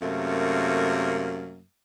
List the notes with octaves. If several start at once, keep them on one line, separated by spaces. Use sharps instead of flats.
F#2 C3 A3 A#3